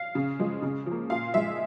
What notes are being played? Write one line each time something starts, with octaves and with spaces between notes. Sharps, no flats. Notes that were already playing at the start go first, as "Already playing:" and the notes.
Already playing: F5
C#3
F3 G#3
C#3
F3 A#3
A#2 F5
F3 G#3 E5